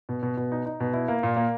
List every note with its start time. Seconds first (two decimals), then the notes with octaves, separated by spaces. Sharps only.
0.09 B2
0.23 B2
0.37 B2
0.52 D#4
0.66 D#4
0.80 B2
0.94 E4
1.08 A#3
1.23 A#2
1.36 A#3